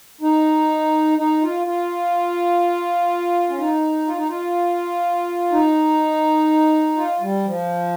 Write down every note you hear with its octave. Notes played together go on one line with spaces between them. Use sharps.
D#4
D#4
F4
F4
C#4
D#4
F4
D#4
F4
D#4
F4
G3
F3